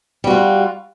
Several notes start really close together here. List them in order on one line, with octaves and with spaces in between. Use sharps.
G3 F#4 F4